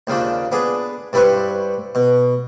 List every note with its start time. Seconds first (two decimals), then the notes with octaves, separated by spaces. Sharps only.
0.07 D#2 C#3 F3 D4
0.52 B3 D4 G#4
1.13 G2 G3 E4 B4 C5 C#6
1.95 B2